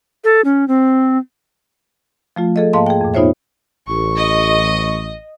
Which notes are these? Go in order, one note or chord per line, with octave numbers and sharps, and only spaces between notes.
A4
C#4
C4
F3 A3 F4
G#4 A4 D#5
G#2 A#3 D#5 F5 A5 C6
G#4 G5
F2 A#2
B3 D#4 F4 C5 C#5 E5
A1 C#6
D#5